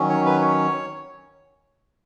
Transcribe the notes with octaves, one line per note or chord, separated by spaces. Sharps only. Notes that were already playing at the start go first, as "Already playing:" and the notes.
Already playing: D#3 F#3 C#4
C#5
B4
C#5